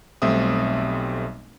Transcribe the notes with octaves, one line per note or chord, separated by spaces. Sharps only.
B1 G3 A3 C4 E5 D#6